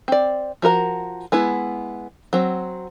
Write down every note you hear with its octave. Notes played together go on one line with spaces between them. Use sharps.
C4 D5
F3 F#4 A#4 A#5
G#3 B3 E4
F#3 C4